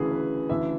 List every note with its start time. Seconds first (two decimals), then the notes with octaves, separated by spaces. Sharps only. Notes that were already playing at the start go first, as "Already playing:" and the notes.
Already playing: D2 C#3 E3 G#4
0.12 B4
0.49 D2 C#3 E3 E5